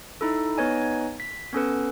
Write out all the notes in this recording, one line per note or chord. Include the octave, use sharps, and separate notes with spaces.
D#4 E4 A4
B3 D#4 B4 C#5 D#5 G#5
B6
B3 C#4 A4 B4